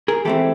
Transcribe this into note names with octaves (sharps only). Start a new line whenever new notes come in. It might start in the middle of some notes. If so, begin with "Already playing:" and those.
G#4 A#4
E3 A3 C4 G4 A4